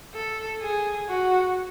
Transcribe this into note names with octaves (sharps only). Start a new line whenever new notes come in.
A4
G#4
F#4